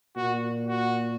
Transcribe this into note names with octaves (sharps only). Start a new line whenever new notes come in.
A#2 F#4
F#4